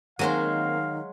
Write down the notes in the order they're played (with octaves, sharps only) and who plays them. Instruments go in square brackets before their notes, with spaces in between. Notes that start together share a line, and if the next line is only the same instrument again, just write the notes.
[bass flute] D#3 [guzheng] F#3 G#3 C5 [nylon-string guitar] A#3 C4 [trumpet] F5